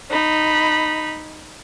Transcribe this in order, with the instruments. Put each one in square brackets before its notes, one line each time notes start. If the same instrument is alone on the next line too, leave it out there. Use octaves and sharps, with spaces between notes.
[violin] D#4 B5